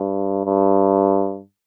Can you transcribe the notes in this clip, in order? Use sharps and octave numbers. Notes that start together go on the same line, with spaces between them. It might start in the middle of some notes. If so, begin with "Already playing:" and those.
Already playing: G2
G2